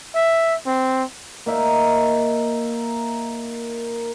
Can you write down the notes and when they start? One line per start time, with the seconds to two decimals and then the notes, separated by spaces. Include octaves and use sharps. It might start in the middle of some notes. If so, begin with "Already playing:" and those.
0.15 E5
0.66 C4
1.46 A#3 D#4 E5